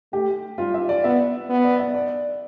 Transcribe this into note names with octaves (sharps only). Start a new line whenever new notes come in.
A3 G4
G3 F4
E5
D5
B3 E5
B3
D5
E5
D5